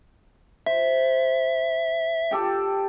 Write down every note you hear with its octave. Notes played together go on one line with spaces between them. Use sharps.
C5 E5
G4 A4 G5